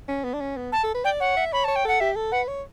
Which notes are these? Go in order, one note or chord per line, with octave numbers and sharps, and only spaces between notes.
C#4
B3
D4
C#4
B3
A5
A4
B4
D5 G5
C#5 F#5
E5
C#5 B5
C#5 A5
G5
A4 F#5
G4 E5
A4
B4 F#5
C#5